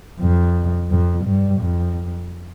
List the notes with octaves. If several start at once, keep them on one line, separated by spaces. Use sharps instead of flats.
F2
F2
G2
F2